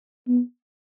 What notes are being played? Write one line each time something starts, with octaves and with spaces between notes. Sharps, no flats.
B3